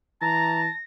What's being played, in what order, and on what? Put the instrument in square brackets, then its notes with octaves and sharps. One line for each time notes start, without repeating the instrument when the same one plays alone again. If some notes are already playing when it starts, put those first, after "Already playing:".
[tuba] E3 [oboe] A5 [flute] A#5 [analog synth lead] A#6